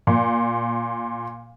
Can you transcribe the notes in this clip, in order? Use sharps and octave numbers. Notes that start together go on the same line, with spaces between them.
A#2